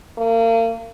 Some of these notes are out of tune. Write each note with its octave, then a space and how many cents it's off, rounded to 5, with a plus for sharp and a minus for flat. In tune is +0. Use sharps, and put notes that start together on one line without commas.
A#3 -35